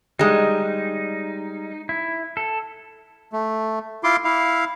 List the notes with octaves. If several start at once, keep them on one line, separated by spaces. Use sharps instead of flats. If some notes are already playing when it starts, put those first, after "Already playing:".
G3 G#3 D#4
E4
A4
A3
E4 F4 C6 D6
E4 F5